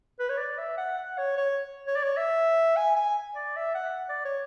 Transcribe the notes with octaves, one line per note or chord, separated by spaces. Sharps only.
B4
C#5
D5
E5
F#5
F#5
C#5
C#5
C#5
D5
C#5
E5
G#5
G#5
D5
E5
F#5
D5
C#5